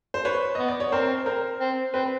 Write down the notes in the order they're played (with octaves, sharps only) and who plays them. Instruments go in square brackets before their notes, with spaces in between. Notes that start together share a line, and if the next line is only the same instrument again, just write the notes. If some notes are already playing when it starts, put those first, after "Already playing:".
[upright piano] C5
B4 C#5
[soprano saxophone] B3 [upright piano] D#5
[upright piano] D5
C#5
[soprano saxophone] C4 [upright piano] A#4 C5
[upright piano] A#4 C5
[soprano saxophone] C4
[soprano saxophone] C4 [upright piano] B4